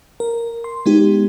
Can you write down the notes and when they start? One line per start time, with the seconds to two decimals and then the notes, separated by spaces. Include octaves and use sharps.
0.20 A#4
0.64 C6
0.86 G#3 B3 D#4 G4